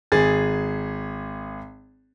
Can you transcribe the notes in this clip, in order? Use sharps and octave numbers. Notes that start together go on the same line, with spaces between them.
G#1 G#4 A6